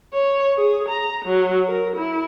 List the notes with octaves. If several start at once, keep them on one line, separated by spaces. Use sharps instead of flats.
C#5
G#4
A#5
F#3
A#4
E4